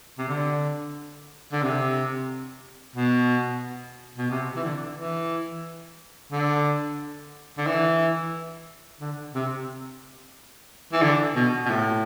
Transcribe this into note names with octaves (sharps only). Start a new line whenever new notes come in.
C3
D3
D3
C3
B2
B2
C3
E3
D3
E3
D3
D3
E3
D3
C3
E3
D3
B2
B2
A2